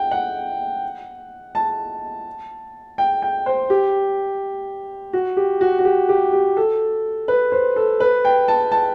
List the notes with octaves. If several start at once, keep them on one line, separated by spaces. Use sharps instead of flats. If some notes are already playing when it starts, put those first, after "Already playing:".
Already playing: F#5 G5
F#5
A5
G5
G5
C5
G4
F#4
G4
F#4
F#4
G4
G4
G4
A4
B4
C5
A4
B4
G5
A5
A5